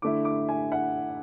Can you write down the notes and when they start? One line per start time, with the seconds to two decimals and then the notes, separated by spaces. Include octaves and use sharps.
0.02 D3 A3 E4 D6
0.25 D6
0.49 G#5
0.72 F#5